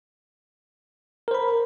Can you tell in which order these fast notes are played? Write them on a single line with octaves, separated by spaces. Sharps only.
A#4 C5 B5